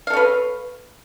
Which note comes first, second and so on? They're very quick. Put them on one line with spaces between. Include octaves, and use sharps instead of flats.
F5 A4 C#5 B4